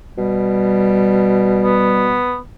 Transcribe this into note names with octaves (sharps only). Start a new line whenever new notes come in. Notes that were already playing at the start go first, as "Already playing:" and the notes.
B2 G3
B3